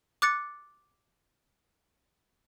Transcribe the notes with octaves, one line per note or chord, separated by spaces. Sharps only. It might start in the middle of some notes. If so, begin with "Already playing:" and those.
D6 F#6 A6 C#7